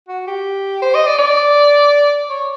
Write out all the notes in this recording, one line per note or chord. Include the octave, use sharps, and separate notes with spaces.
F#4
G4
C5
D#5
D5
D5
C#5